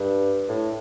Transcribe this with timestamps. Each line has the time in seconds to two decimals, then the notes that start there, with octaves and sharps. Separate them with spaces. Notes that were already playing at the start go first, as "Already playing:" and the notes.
Already playing: G2
0.49 A2